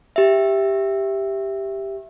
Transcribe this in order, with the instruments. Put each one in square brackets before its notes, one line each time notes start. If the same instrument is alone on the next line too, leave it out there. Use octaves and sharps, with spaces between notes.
[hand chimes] G4 E5